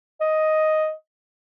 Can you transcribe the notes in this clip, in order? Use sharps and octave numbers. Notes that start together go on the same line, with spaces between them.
D#5